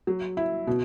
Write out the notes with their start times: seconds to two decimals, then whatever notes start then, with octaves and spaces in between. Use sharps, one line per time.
0.07 F#3
0.37 E4
0.67 B2